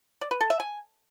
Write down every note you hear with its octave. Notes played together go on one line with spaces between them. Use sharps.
D5
B4
A4
E5
G#5